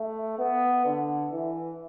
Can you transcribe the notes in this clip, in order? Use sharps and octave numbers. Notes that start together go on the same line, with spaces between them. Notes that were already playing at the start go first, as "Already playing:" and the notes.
Already playing: A3
B3
D3
E3